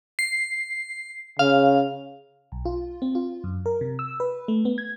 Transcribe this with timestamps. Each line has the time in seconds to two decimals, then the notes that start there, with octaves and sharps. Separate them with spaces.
0.19 C7
1.39 C#3 F5
2.52 B1
2.65 F4
3.02 C4
3.15 F4
3.44 F#2
3.66 A#4
3.81 C3
3.99 E6
4.20 B4
4.48 A3
4.65 B3
4.78 G#6